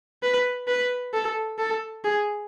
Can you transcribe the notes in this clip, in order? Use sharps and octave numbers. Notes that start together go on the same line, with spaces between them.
B4
B4
A4
A4
G#4